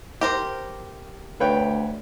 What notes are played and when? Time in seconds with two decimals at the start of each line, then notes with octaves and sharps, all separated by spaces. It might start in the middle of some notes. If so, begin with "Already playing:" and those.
0.21 G4 A#4 C5
1.40 D2 B4 C#5 G5